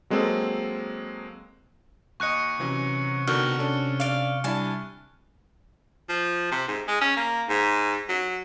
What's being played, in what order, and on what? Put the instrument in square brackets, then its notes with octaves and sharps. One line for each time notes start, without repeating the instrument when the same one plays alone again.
[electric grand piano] F#3 G#3 A#3 C4 A4
[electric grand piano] D#2 D#5 [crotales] C#6 F#6 C#7
[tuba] C3 [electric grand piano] E3 F#3 C#4
[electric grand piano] B2 D3 D#3 [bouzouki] F#4 [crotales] F6
[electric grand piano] C#4 D4 A4
[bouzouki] D5 F5
[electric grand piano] G3 D4 E4 [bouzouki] G#5 A5
[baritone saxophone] F3
C3
G#2
G#3
C#4
A#3
G#2
F#3